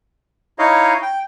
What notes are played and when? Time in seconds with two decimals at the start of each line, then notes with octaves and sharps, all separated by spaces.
0.59 D#4 E4 C#5 D#5 F5
1.02 G5